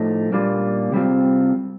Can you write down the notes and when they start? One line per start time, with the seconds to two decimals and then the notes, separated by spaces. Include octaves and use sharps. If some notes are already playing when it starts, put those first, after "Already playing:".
Already playing: A2 F3 A3 D#4
0.32 A#2 G3 A#3 D4 F4
0.92 C3 G3 C4 F4